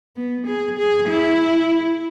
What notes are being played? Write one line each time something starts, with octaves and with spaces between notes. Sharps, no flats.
B3
G#4
G#4
E4